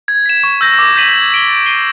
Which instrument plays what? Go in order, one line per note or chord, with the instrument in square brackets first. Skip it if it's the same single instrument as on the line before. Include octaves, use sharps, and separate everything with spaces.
[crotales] G#6
B6 E7
C#6
E6 G6 A#6
D6
G6 B6 D#7 F#7
G#6
B6 D7 G7
A6
C7 D#7 G7